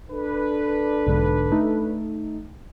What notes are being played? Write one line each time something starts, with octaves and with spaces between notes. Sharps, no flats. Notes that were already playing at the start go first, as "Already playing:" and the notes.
D4 A4 B4
B1 G#2 D3
A3 D#4